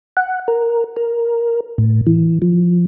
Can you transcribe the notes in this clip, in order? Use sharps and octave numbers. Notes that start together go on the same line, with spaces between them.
F#5
A#4
A#4
A2
E3
F3